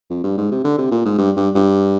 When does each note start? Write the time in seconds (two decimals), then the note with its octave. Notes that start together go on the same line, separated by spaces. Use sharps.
0.10 F2
0.24 G2
0.38 G#2
0.52 C3
0.64 D3
0.78 C3
0.91 A#2
1.05 G#2
1.18 G2
1.37 G2
1.55 G2